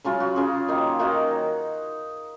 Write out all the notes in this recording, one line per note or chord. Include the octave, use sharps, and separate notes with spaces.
C#3 F#3 C#4 F4
F#4
C#3 F#3 C#4 F4 G#4
D#3 A#3 D#4
D#3 A#3 D#4 F#4